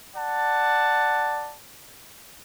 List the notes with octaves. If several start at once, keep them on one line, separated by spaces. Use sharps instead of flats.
D5 F#5 A5